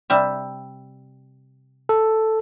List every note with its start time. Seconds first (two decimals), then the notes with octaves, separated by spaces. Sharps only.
0.10 C3 G3 E5
1.89 A4